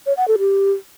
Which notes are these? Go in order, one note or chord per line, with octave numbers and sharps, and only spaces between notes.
C#5
F#5
A4
G4